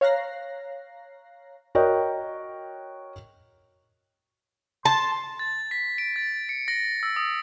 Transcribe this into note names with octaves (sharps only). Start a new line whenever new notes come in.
C#5 F5 A#5 F#6 A#6 C7
F#4 A#4 C#5 D#5 G5
A5 C6
A6
B6
D7
A6
C#7
A#6
E6
D#6